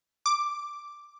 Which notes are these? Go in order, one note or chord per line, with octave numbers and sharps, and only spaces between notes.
D6